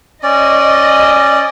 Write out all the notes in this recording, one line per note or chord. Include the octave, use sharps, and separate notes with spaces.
C#4 D5 D#5